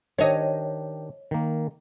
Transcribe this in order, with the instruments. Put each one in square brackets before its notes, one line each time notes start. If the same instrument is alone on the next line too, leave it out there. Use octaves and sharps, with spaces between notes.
[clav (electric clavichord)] D#3 D4 G4 [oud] C#5 D#5
[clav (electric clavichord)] D#3 A#3